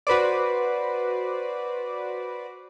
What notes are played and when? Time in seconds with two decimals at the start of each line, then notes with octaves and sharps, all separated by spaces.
0.07 F#4 B4 C5 D5